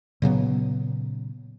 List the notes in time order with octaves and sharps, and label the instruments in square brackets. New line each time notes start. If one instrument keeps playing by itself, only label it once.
[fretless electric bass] A#2 C#3 F#3 B3